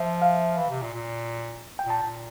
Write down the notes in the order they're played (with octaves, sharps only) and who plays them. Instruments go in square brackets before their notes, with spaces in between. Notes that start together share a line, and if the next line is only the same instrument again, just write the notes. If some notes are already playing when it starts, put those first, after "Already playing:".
Already playing: [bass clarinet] F3 [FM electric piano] E5
[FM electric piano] F5
[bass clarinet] E3
C3
A#2
A#2
[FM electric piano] G5
[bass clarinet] A#2
[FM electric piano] A5
[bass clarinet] A#2